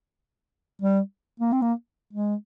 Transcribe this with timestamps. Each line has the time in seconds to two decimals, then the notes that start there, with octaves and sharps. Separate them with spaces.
0.82 G3
1.40 A#3
1.52 C4
1.62 A#3
2.13 G#3